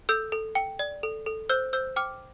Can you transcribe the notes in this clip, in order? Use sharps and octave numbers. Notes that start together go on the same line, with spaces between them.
A4 E6 G6
A4
G5
D5
A4
A4
C5 E6 G6
C5 E6 G6
G5 D6 F6